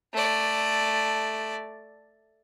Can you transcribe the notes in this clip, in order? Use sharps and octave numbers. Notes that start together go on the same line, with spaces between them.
A3 D5